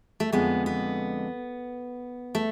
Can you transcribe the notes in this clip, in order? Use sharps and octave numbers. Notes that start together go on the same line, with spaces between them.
A3
F2 D3 G#3 B3
B3
A3